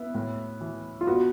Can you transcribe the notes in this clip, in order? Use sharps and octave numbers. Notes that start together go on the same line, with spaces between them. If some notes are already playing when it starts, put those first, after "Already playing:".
Already playing: B3 E4
A2
E3
F4
B3 F#4